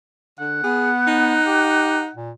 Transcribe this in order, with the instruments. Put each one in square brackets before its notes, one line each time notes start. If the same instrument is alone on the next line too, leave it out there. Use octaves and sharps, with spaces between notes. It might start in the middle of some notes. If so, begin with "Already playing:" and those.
[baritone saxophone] D3 [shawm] F#5
[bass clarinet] B3 [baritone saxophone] G#4
[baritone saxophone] D#4
[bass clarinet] G4
A#2